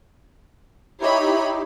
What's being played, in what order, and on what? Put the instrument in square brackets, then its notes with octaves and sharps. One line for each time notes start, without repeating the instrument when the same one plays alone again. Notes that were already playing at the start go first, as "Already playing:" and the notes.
[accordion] D#4 E4 G4 [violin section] C#5 D#5 B5